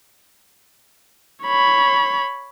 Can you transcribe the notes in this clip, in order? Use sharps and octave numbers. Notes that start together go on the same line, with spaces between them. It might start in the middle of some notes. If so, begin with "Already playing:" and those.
C#5 B5